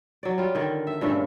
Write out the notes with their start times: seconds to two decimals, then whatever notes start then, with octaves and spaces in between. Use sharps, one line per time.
0.23 F#3 D5
0.38 G3 F4
0.55 D3 D#3
0.87 E5
1.01 G2 A#2 C#3 A3